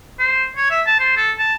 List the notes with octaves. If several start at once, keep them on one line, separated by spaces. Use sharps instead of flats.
C5
C#5
E5
A5
C5
A4
A5